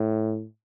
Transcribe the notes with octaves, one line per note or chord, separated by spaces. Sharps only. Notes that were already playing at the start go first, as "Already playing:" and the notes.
Already playing: A2